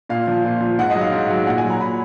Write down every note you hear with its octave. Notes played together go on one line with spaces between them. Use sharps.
A#2 F5
F3
A#2
F3
G#2 F#5
D#5
F#3
F5
G#2
F#3
A#2 F#5
G#5
F#3
A#5
A#2 B5